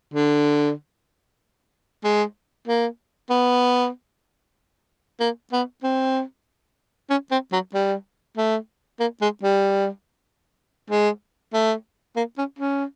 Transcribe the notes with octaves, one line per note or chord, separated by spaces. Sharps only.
D3
G#3
A#3
B3
A#3
B3
C4
C#4
C4
F#3
G3
A3
A#3
G#3
G3
G#3
A3
A#3
C#4
C#4